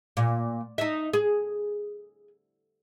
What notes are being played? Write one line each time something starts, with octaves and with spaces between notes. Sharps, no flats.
A#2
D#4 E5
G#4